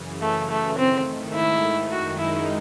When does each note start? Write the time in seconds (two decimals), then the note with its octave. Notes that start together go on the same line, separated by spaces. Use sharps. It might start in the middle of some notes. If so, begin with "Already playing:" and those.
Already playing: F#2 C#3 E3
0.22 A3
0.50 A3
0.78 G#2 D#3 A3 C4
1.34 E4
1.91 F#2 D#3 G#3 D#4 F#4
2.19 E4